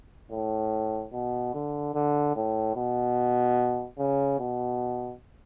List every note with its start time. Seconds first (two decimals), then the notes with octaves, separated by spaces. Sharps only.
0.31 A2
1.13 B2
1.54 D3
1.94 D3
2.35 A2
2.76 B2
3.98 C#3
4.39 B2